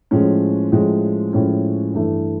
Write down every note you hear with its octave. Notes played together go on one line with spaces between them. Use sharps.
A2 F3 G#3 C#4
A2 F3 G#3 C#4
A2 F3 G#3 C#4
G2 E3 A3